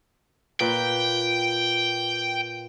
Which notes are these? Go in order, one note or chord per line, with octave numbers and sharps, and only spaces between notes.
A#2 B4 G5